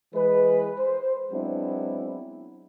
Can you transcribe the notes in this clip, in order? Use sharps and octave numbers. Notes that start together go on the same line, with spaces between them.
E3 G#3 G#4 B4
C5
F#3 G#3 B3 C4 D4 E4